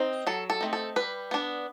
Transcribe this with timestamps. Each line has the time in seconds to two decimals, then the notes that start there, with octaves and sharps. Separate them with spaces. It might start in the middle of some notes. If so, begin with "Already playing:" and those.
Already playing: C4 D#4
0.27 F#3 A4
0.50 A4
0.61 A3 C4 D#4
0.73 A4
0.96 G3 B4
1.31 B3 D4